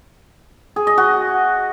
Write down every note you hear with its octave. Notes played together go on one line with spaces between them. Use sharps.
G#4
D#5
F#4